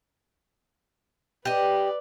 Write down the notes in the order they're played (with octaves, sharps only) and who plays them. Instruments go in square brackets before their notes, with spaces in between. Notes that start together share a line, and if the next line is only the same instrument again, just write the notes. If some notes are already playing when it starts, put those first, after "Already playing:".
[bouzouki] G4 D#5 [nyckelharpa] B4 D5